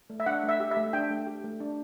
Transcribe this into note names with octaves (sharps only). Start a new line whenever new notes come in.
A3
E5
D4 F#5
A3
E5
G4
E5
A3
D4 G5
A3
G4
A3
D4